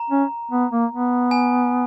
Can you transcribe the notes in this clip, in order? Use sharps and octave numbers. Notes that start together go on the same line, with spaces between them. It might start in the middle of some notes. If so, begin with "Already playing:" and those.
Already playing: A#5
C#4
B3
A#3
B3
G#5